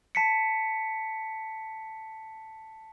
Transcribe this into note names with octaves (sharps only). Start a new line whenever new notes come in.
A5 B6 C#7